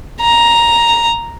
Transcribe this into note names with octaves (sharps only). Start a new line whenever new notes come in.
A#5